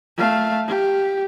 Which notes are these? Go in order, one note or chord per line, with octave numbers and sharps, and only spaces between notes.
A3 F5
G4